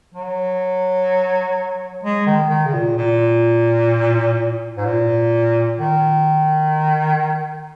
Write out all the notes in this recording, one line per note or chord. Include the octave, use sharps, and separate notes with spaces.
F#3
G#3
D#3
D#3
C#3
A#2
A#2
G#2
A#2
D#3